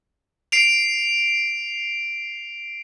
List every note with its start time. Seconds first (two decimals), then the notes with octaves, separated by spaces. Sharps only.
0.52 C7 D7 F7